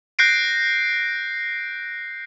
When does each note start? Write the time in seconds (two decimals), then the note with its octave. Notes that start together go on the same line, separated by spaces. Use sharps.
0.19 F#6 G6 A#6 C7 D7